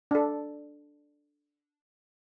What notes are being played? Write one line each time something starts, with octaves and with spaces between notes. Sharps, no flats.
D4 A4